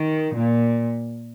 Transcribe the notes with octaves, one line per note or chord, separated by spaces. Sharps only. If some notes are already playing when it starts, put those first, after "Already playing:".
Already playing: D#3
A#2